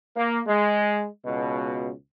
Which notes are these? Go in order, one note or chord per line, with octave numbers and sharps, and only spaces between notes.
A#3
G#3
C#2 B2